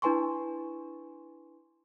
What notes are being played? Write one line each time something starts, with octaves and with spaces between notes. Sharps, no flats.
D4 E4 B4 G#5 C6 C#6